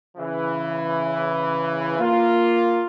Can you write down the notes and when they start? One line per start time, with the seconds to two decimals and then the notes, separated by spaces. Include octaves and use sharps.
0.18 C#3 E3
1.99 A#3 F4